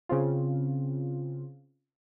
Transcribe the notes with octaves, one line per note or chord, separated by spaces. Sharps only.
C#3 C4 F4